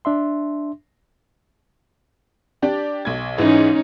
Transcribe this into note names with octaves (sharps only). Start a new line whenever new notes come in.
D4 E5 C6
D4 G4 D5
B1 G#6
G#2 E3 C#4 D#4